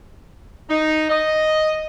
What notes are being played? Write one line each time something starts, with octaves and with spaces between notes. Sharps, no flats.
D#4
D#5